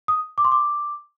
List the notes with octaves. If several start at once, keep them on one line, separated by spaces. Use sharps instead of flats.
D#6
D6
C6
D6